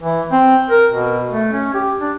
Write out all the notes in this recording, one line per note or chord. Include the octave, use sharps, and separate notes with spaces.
E3
C4
A#4
B2
A3
C#4
G4
D4